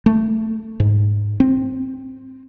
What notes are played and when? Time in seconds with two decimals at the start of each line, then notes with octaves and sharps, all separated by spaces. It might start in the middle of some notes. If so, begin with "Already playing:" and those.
0.06 A3
0.80 G#2
1.40 C4